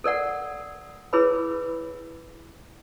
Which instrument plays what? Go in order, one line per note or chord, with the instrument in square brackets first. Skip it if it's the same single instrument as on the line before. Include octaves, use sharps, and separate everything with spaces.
[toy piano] A4 A#4 D5 F#5
E4 G#4 A#4 B4 C#5 B5